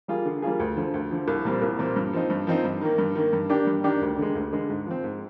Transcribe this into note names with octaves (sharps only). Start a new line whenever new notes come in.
G3 A#3 F4 G#4
D3
G3 A#3 F4 G#4
D2
D3 F3
D2
D3 F3
C2
A#2 G3 C4
C2
A#2 G3 C4
G2
F3 C4 D#4
G2
F3 C4 D#4
G2
D#3 A#3
G2
D#3 A#3
G2
D#3 A#3 D4 G4
G2
D#3 A#3 D4 G4
D2
D3 G#3
D2
D3 G#3
G#2
F3 C4
G#2